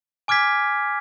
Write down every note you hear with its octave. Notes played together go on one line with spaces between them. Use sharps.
G#5 D6 F6 G#6 B6